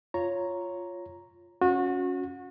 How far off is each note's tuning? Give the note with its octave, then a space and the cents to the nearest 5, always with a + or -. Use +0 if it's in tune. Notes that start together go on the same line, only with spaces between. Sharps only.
F4 +0 C#5 +0 A#5 +0
C#4 +0 F#4 -30